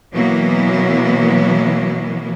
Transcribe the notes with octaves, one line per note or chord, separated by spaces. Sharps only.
B2 E3 F#3 A#3 B3